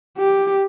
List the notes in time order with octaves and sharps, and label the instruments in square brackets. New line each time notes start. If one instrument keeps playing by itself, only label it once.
[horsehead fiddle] G4